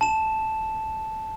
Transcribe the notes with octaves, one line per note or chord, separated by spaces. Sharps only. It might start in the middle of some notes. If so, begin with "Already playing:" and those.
A5 E7